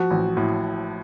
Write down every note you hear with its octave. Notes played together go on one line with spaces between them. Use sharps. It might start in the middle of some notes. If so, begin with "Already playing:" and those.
Already playing: F3 F#4
A1
A2